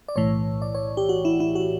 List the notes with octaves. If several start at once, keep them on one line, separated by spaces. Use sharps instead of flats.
D5
B1 A2 E3 C#5
D5
C#5
G4
F#4
E4
E4
F#4